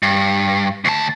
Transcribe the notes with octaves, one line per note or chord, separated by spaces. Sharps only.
G2
D2 A5